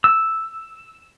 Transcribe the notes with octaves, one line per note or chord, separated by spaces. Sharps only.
E6